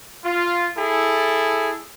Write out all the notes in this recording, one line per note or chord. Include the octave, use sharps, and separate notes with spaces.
F4
E4 G#4 A4